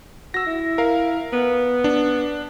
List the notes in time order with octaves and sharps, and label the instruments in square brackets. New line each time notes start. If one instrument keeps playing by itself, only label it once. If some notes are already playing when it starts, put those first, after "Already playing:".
[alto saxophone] F#4 [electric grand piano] E6 A#6
[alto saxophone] E4
[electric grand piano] A#4 F5
[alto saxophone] B3
[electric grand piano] D4